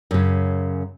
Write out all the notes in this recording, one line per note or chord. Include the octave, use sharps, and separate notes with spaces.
F#2 C#3